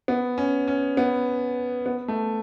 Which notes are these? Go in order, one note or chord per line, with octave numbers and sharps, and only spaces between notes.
B3
C#4
C#4
B3
B3
A3